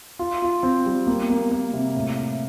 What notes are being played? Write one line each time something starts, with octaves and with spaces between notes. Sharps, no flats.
F4
F4
C4
G3
A#3
A#3
A#3
C3
A2
E4